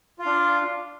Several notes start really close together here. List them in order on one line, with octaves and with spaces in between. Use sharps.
F4 F5 D4